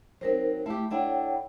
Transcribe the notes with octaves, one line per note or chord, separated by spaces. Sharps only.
F#3 C4 D#4 A#4 C5
A3 E4 G4
A3 D4 E4 C#5 F#5 G5